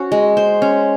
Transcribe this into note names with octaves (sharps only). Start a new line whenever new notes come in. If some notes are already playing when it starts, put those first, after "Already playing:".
Already playing: C#4 F#4 C5
G#3
C5
C#4